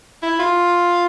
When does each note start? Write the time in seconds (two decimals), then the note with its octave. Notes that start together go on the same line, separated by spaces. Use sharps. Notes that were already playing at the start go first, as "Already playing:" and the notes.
0.23 E4
0.39 F4